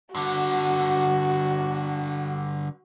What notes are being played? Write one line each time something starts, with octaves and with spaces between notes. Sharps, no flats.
G2 D3 F#4